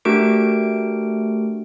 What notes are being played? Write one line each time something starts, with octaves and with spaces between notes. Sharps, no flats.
A3 D4 F#4 G4 A#4 D7